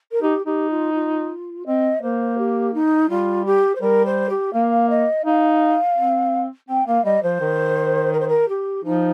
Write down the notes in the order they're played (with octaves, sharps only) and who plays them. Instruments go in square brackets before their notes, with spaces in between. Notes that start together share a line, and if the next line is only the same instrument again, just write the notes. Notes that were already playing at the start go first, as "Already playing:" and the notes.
[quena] A#4
[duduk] D#4 [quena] G4
[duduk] D#4 [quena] G4
[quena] F4
F4
[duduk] C4 [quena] D#5
[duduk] A#3 [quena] C5
[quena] G4
D#4
[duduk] G3 [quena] F4
[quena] G4
C5
[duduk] G3 [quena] A#4
[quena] C5
G4
[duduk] A#3 [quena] F5
[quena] D#5
[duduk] D#4 [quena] F5
[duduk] C4
[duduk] C4 [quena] G5
[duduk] A#3 [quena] F5
[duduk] G3 [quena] D#5
[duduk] F3 [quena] C5
[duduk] D#3
[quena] A#4
C5
A#4
G4
[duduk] F3 [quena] D#4